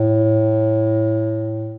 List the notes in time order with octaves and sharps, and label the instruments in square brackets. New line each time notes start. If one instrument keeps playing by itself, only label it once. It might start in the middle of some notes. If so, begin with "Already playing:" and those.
Already playing: [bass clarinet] A2